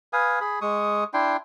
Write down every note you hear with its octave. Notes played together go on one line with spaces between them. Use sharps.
B4 F5 G#5 D#6
G#4 B5
G#3 C#6 D#6
D4 E4 G5 C6